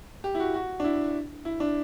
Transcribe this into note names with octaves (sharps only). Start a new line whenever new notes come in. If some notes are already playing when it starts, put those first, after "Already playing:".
G4
E4
F#4
F#4
D4
E4
E4
D4